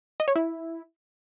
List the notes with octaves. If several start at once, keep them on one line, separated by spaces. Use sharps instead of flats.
D#5
C#5
E4